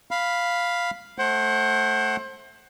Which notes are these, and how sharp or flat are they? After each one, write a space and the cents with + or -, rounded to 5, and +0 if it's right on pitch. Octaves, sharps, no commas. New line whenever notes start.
F5 +0 B5 +0
A3 +0 C5 +25 F#5 +25